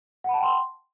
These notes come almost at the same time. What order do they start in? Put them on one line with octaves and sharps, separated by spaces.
F#5 B5 A5 G5 C6